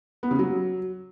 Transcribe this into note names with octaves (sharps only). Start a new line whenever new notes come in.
B3
C#3
F#3